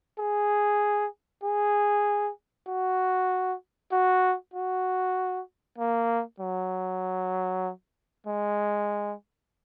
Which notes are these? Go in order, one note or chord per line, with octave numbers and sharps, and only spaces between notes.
G#4
G#4
F#4
F#4
F#4
A#3
F#3
G#3